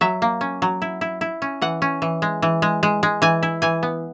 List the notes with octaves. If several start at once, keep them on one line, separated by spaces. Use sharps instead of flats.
F#3 E5
A#3
C#4
F#3
E4
E4
E4
C#4
E3 F#5
C#4
E3
G#3
E3
G#3
G#3
G#3
E3 G#5
E4
E3 G#5
B3